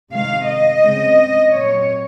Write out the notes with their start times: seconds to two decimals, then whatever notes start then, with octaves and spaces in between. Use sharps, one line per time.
0.12 C3 D#3 G#3 F5
0.47 D#5
0.82 C#3 G#3 C4
1.55 A#2 F#3 C4 C#5